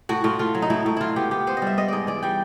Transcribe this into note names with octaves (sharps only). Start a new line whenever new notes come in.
A2 F#4
A2 F4
A3 F4
F#3
D#4
A2 E4
A2 E4
F#3 E4 F4
B3 G4
B3 G4
B3 C5
D#5
G3 E5
B3 D#5
G#2 D5 D#5
E3 D5
G3 G5